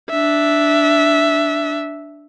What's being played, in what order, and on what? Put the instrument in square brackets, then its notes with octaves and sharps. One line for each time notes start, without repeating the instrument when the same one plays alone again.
[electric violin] D4 E5